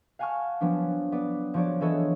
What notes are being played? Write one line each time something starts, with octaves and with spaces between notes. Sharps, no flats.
F5 F#5 G#5 A5 C#6 F6
F3 F#3 B3 D4
B3 D5
F3 D4 F#4 C#5 D5
E3 B3 A4 C#5 D#5